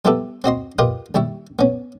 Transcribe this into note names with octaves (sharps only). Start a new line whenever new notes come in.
G3 B3 E4 G4 A4 B4
C4 F#4 D#5 C6
F4 G4 A#4 B4 D#5
D#2 G3 E4 C#6
B3 C#4